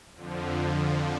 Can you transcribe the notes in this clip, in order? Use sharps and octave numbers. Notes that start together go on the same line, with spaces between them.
F2 D3 F3